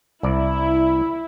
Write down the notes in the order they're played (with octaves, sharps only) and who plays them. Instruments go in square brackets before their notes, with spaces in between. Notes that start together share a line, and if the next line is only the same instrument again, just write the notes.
[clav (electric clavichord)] C2 D5 [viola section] E4